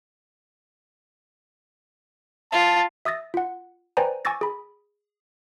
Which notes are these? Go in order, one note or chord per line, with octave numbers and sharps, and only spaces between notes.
F4 A5
E5 D#6 E6 A6 A#6
F4 F#5
B4 C5 D5 G5 G#5 A#5
G#5 C#6 D6 E6 A6 A#6
G#4 B5